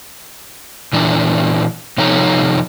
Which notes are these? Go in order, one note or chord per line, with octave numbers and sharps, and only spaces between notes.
A#2 E3 D4
C3 F3 D#4 A4 C#5 A#5